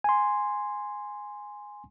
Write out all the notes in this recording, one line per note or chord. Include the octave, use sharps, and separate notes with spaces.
G#5 C6